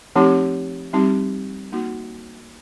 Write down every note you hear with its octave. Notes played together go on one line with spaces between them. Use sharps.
F3 A3 C4 D#4 G4
G3 C4 D#4 G4
A#3 D#4 F#4